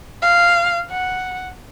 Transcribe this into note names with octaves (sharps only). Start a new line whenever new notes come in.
F5
F#5